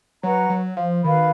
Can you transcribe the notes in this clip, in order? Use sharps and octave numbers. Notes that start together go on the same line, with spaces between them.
F#3 B4 F#5 A#5 C#6
F#3
F3
D#3 F#4 B4 F5 B5